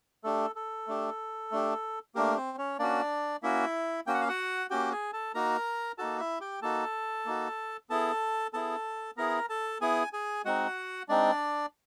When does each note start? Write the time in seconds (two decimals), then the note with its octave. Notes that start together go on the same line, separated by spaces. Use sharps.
0.24 A3 D4 G4 A4
0.56 A4
0.87 A3 D4 G4
1.52 A3 D4 G4
2.15 A3 A#3 D4 G4 A#4
2.37 C4 C5
2.58 C#4 C#5
2.79 A#3 C#4 D4 F#4 D5
3.43 A#3 C#4 E4 F#4 E5
4.07 A#3 C#4 F#4 G5
4.14 F#5
4.21 F5
4.29 F#4 F#5
4.70 A#3 C#4 F#4 G4 G5
4.92 G#4 G#5
5.13 A4 A5
5.34 A#3 D#4 F#4 A#4 A#5
5.98 A#3 D#4 F#4 A4 A5
6.20 E4 E5
6.40 G4 G5
6.62 A#3 D#4 F#4 A4 A5
7.26 A#3 D#4 F#4
7.90 B3 E4 G#4 A4 A5
8.53 B3 E4 G#4 A4 A5
9.17 B3 E4 G#4 A#4 A#5
9.49 A4 A5
9.81 B3 E4 G#4 G#5
10.13 G#4 G#5
10.45 G#3 C4 D#4 F#4 F#5
11.09 G#3 C4 D4 D#4 D5